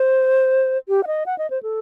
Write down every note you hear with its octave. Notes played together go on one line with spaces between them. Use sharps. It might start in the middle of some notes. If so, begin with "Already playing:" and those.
Already playing: C5
G4
F#5
D#5
F#5
D#5
C5
A4